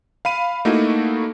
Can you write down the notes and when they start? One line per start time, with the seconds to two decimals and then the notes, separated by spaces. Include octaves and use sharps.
0.25 F5 B5 D#7
0.65 A3 A#3 D#4 E4 F#4